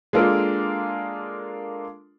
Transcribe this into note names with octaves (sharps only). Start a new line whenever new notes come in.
G#3 A#3 D4 F4 A4 A#4